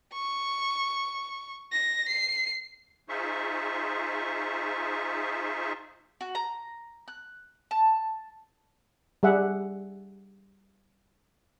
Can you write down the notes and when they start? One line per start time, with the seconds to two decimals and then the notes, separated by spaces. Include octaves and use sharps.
0.13 C#6
1.72 A#6
2.09 C7
3.09 D#4 F4 G#4 C5 E5 C#6
6.21 F#4
6.35 A#5
7.08 F#6
7.71 A5
9.23 G3 G#4 E5 F#5